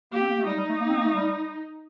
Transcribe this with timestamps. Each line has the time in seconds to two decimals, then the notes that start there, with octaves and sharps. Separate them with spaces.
0.13 A#3 G4
0.21 C4
0.29 A#3
0.38 A3
0.46 G3 D#4
0.58 G3
0.69 A3
0.80 A#3
0.89 C4
0.97 A#3
1.05 A3
1.14 G3